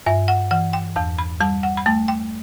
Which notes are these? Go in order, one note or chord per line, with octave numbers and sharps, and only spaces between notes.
G2 E5
F#5
E3 F#5
G5
E2 A5
B5
G3 A5
F#5
B5
A3 A5
G5